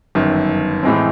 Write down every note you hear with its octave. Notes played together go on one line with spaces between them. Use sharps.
G1 F#2 D#3
A2 E3 G#3 C4